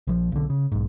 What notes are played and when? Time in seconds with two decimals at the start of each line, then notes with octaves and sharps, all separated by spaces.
0.07 A#1 E3 F3
0.32 B1 D3
0.50 C#3
0.72 B1 G#2